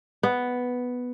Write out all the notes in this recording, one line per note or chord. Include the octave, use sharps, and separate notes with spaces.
B3